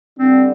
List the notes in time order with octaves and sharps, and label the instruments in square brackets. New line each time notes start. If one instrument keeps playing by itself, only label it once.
[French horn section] D3 G3 D4 [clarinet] C4